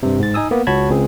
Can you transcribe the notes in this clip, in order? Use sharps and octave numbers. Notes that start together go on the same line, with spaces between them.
G2 C3
G#2 A6
D#4 G#5 D#6 E6
A#3 B3
C#2 F#4 C#5 A5 B5 G#6
C#2 C4 G#4